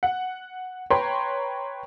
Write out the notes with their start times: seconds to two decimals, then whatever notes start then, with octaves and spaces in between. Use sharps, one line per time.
0.03 F#5
0.90 B4 C#5 G5 A#5 C6